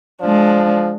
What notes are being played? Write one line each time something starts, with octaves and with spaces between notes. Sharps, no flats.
F3 G#3 D4